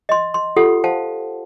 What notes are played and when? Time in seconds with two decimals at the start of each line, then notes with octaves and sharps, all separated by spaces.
0.09 D#5 C6
0.34 C6
0.56 F4 G4 A4 F#5
0.84 C5 F5 F#5 A5